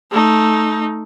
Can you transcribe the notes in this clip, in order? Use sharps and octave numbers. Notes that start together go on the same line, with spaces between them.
A3 D#4